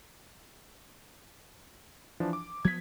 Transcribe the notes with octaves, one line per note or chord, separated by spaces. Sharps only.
E3 F3 D4
D6
F3 F#3 B3 G#6 B6